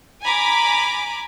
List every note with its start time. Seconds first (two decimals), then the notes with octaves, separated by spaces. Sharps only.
0.23 G#5 A#5 B5 D6 B6